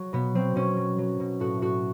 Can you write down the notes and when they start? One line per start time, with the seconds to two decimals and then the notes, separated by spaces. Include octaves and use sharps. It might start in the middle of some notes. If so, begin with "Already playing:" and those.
Already playing: F#3
0.13 B2 B3
0.35 F#3 C4
0.56 B2 C#4
0.76 F#3
0.98 F#3
1.20 B2
1.40 A2 F#4
1.61 A2 F#4